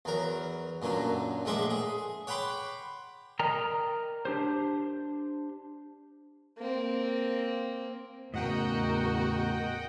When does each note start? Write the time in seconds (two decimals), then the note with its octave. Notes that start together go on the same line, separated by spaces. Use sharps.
0.05 E2 F#3 A#4
0.82 F#2 A#2 D3 F#3
1.45 A#1 A2 G#3 E5 C6 D6
1.70 G#4
2.27 C#5 F#5 G5 B5 C6 D6
3.39 A#4 D5 D#5 G5 A#5
4.25 D4 G4 C5
6.58 A#3 C4
8.34 E2 A2 C#3 F#4 A#4 D#5 F#5 G5